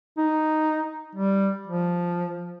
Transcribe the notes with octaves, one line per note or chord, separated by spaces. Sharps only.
D#4
G3
F3